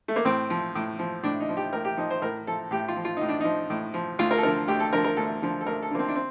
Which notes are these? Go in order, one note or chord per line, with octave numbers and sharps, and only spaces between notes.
A3
A#3
A2 C4
F3
A2
F3
A2 D4
D#4
F3
G4
A2 A#4
G4
F3 D#4
C5
A2 A#4
F3 A4
A2 G4
F4
F3
F4
A2 D#4
D4
F3 D#4
A2
F3
D2 F4
A#4
A4
D3 F3 A#4
D2 G4
A4
D3 F3 A#4
A#4
D2 A4
D3 F3
A4
D2 A#4
A4
D3 F3 A#3
C4
D4
C4